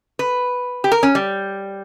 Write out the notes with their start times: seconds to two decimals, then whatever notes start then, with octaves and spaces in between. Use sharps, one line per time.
0.19 B4
0.84 G4
0.92 A#4
1.03 C#4
1.15 G3